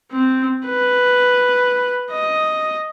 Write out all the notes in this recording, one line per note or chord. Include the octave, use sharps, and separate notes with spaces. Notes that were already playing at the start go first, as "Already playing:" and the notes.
C4
B4
D#5